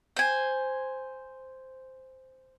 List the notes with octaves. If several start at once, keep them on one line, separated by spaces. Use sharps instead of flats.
C5 G#5